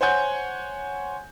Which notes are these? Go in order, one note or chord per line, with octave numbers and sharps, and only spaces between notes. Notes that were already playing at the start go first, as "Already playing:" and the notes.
C5 C#5 F#5 G#5 G6